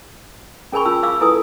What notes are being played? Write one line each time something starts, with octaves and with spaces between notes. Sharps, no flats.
C#4 G#4 A#4 G#5 B5 C#6
C#4 F4 A5 E6
F5 D6 E6
E4 A4 B4 G#5 D#6